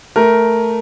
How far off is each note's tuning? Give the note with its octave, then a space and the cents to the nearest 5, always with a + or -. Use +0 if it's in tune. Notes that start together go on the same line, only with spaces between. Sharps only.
A3 +0 A#4 +5